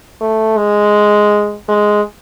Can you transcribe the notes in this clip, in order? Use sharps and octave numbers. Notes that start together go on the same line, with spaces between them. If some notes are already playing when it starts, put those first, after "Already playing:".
A3
G#3
G#3